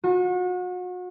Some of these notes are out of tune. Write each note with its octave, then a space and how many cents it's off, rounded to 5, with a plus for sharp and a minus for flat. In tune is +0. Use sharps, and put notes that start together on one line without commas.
F#4 -35